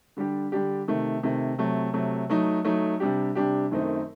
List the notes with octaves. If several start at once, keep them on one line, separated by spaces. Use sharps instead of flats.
D3 G3 D4 G4
D3 G3 D4 G4
C3 D#3 A3
C3 D#3 A3
C3 F#3 A3
C3 F#3 A3
F#3 A3 D#4
F#3 A3 D#4
C3 G3 D4 G4
C3 G3 D4 G4
F#2 D#3 A3 C4 D#4